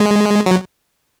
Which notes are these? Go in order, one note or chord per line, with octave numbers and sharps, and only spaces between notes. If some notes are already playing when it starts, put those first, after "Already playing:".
Already playing: G#3
F#3